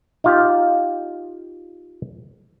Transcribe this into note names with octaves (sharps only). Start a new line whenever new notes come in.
D#4 F4 G4